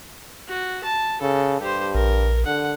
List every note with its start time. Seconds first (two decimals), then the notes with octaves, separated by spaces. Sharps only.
0.48 F#4
0.84 A5
1.21 C#3 A4
1.60 G2 G4 C5
1.95 A#1 A#4
2.46 D3 F#5